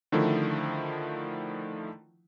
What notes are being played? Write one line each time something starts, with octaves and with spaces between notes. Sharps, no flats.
D3 D#3 F3 A3 E4